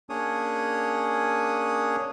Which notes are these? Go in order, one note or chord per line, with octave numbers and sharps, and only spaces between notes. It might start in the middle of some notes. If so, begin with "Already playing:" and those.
A#3 C#4 D4 G#4 C#5 D#6